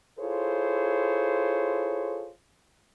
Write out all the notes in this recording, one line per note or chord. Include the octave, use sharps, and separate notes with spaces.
E4 F4 G#4 A4 C5 C#5